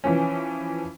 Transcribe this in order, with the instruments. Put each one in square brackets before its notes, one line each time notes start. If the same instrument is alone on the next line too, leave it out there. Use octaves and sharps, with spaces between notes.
[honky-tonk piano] E3 F3 C#4